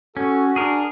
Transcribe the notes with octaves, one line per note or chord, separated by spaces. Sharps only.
C#4 F#4 A4
D4 G#4 A#4